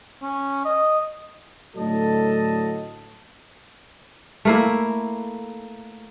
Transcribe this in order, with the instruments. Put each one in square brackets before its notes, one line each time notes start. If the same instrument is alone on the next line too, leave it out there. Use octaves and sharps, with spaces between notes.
[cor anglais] C#4
D#5
[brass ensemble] A2 D3 F#3 A4 D#5 A5
[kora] A3 A#3 E4